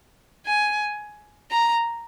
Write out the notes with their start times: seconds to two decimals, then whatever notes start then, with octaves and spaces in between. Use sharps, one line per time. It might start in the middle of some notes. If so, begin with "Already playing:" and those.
0.46 G#5
1.51 A#5